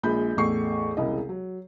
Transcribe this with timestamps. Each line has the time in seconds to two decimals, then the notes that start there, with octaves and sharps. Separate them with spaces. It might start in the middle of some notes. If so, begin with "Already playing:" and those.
0.03 A#1 A#2 G#3 B5 G6
0.37 A1 E2 A3 C#6 C7
0.97 E1 C2 C#3 E4 D#5
1.29 F#3